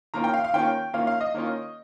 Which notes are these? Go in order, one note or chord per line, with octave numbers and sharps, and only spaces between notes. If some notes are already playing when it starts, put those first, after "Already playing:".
D#3 A#3 C#4 F4 A#5
G5
F5
F5
D#3 A#3 C#4 F4 G5
D#3 A#3 C#4 F4 F5
F5
D#5
D#3 A#3 C#4 F4